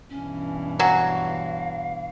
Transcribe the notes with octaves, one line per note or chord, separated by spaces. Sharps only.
G2 B2 E3 C#4
F#3 F#4 F5 F#5 G#5